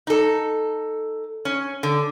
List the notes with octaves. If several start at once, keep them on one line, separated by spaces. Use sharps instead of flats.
D#4 A4
C#4
D3